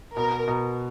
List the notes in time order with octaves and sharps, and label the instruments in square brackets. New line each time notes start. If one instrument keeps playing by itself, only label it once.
[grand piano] B2 [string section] A#4
[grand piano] B2